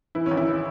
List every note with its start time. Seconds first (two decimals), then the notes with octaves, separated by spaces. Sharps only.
0.15 E3 E4
0.26 C#4
0.31 G#1
0.37 E4
0.48 E3